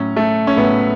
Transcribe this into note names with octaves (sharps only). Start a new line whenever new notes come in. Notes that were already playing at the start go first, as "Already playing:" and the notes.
Already playing: A2 F#3 C#4
A3
C#4
A2 F#3 B3